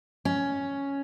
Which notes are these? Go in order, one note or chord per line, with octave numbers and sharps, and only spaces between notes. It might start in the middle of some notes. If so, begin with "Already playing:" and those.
C#4